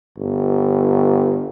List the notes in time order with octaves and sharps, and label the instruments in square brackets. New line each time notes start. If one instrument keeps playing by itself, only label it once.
[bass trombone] G1